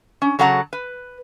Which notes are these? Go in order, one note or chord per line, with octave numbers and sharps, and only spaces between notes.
C#4
C#3 F#3 A4 F#5 A#5
B4